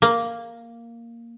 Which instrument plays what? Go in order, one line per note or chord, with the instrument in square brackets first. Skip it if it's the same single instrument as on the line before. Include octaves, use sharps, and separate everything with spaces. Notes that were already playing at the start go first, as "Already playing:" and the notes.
[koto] A#3